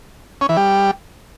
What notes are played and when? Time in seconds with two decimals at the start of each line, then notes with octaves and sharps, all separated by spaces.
0.41 C#4
0.49 E3
0.57 G3